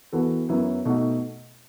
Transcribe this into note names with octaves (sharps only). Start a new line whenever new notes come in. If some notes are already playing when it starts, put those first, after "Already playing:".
E3 B3 F#4 A4
F#2 F#3 B3 E4
B2 A3 D#4 F#4